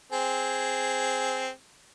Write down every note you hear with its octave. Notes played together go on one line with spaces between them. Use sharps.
C4 G#4